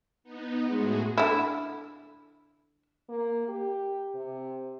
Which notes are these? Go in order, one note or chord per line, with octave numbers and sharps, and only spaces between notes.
B3 D#4
A2 G#3 F#4 G#4
D3 E4
A#3
G4
C3